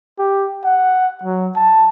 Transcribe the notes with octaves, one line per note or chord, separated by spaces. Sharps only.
G4
F#5
F#3
A5